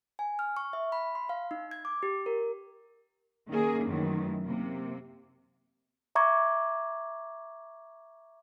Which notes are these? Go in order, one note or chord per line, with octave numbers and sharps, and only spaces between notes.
G#5
F6
C#6
E5
B5
C6
F5
D#4
G#6
D6
G4
A#4
D#3 A#3 C#4 G#4 A#4
F#2 D#3 E3 F#3 A3
C3 A#3
E5 A#5 C#6 D6 G#6